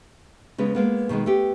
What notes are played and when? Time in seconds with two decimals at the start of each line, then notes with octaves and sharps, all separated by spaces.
0.58 C#3 G#3 B3
0.75 G#3 A#3 B3
1.09 B2 D#3 G3 G#3
1.26 A3 B3 G4